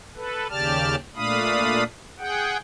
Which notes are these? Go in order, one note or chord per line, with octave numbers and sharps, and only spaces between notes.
A4 B4
D#2 C#3 G4 D5 A5 F6
A#2 A3 D4 F5 B5 D#6
G#4 F#5 G5